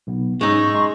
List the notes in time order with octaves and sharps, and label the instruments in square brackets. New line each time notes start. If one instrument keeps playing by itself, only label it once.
[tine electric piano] B1 B3
[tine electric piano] G#2 C#4 E6 [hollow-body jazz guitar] G#3 D#4 [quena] C#6
[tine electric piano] D#5 A#5 C6